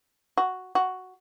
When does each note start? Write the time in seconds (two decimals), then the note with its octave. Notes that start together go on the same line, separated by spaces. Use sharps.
0.37 F#4
0.75 F#4